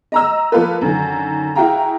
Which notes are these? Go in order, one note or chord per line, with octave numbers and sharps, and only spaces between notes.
D#5 A#5 E6
F3 A#3 F4 A4 B4
F#2 D3 D#3
E4 F#4 G#4 F5 G5 A#5